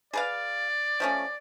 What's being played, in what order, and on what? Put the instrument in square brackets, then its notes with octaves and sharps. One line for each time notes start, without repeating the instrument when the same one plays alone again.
[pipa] G#4 B4 F5 [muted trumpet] D5
[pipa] F3 A3 C#4